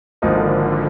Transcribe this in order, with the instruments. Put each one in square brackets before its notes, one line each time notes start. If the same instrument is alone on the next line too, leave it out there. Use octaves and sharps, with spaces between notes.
[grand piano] G#1 G#2 F3 A#3 D#4 [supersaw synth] D3